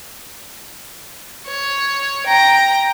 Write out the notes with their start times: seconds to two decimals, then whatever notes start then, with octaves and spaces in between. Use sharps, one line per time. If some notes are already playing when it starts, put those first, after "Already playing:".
1.48 C#5
2.26 G5 A#5